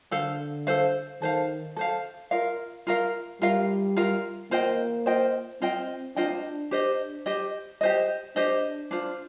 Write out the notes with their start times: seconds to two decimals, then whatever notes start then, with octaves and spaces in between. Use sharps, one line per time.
0.11 D3 A4 C5 F5
0.67 A4 C5 F5
1.21 D#3 A4 C5 F5
1.76 A4 C5 F5
2.31 F4 A#4 F5
2.87 F4 A#4 F5
3.41 G3 F4 A#4 F5
3.96 F4 A#4 F5
4.51 A#3 F4 C5 D#5 G5
5.06 F4 C5 D#5 G5
5.61 C4 F4 C5 D#5 G5
6.16 D4 F4 C5 D#5 G5
6.71 D4 G4 C5 D#5
7.26 G4 C5 D#5
7.81 G4 C5 D#5
8.36 D4 G4 C5 D#5
8.91 D4 F4 C5